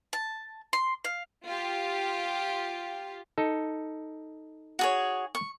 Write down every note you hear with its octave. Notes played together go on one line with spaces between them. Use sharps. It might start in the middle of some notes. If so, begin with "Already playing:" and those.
A5
C6
F5
F4 G4
D#4 A4
F#4 G#4 C#5
C#6